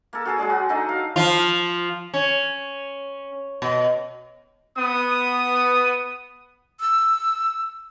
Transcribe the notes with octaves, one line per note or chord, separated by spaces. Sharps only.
A#3 A4
F#4 G#4 A4
F#3 G#3 G#4 D5
F#4
D4 D#4 A4 D#5
F5
F3 F4
C#4
B2
B3 D#6
E6